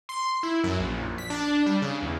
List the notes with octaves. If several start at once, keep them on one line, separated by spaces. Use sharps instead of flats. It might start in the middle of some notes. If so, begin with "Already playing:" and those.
C6
E4
F#2
A#1
B6
D4
G3
C#3
E2